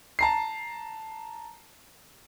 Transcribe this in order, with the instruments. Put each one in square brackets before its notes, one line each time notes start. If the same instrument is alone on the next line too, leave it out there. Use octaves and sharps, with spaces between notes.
[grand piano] A5 A#5 C7